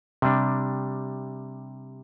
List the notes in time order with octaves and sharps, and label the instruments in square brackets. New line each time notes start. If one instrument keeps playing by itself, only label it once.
[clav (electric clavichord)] C3 G3 D4